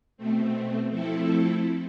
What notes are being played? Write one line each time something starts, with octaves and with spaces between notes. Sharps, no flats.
B2 A3 C4
F3 A3 C4 E4 A4